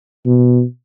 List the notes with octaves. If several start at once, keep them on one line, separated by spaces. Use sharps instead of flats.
B2